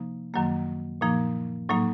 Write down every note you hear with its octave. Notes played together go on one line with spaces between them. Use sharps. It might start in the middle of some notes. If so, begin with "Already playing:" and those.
Already playing: C3 F3 A#3 D#4
F#2 D#3 F#3 A#3
A#2 F3 A#3 D#4
A2 F#3 A#3 D#4